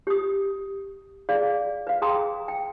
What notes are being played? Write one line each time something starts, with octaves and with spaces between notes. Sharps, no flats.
G4 D#6
G#4 D5 F5
B4 F5
G#4 G5 A#5 C6 D#6
G5